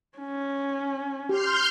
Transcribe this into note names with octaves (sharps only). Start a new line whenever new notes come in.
C#4
G4 C6 F6 G6